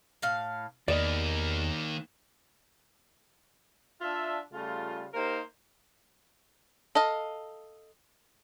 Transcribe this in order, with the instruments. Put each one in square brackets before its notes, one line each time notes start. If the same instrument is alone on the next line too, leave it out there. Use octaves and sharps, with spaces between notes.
[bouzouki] A2 F5
[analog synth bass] E2 [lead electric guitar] D#3 A#3 [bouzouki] B3 [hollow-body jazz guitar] D5 D#5
[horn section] D4 F4 E5
C#3 G3 A3 F4
A#3 D#4 G4 A#4 C5
[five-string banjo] A4 D#5 F5